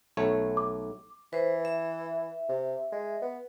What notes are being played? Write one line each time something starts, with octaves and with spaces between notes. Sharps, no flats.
B1 A3 C#5
D6
E3 B4 C5
E5
C3
G#3
B3